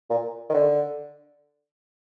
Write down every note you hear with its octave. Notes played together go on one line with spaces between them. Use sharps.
A#2
D#3
D3